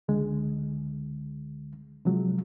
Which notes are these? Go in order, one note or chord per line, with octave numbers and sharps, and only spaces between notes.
C#2 D3 G#3
C3 F3 F#3 G#3